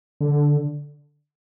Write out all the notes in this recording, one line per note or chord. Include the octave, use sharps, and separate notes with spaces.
D3